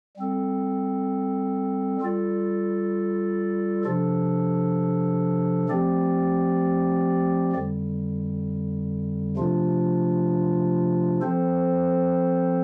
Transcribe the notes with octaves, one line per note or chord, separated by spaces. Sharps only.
G3 C4 A4
G3 F4 A4 D5
C3 F3 D4 A4
F3 A3 C4 G4 D5
F2 D3 G3
C3 F3 A3 D4 F4
F3 C4 A4 C5